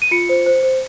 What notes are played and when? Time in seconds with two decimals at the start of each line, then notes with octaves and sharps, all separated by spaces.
0.02 D#7
0.11 F4 C#7
0.29 C5
0.46 C5
0.63 C5